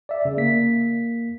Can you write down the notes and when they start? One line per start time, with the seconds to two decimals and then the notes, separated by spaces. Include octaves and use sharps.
0.09 D5 E5
0.25 C#3
0.37 A#3 B6